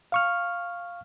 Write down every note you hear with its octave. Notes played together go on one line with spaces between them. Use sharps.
F5 C#6 F6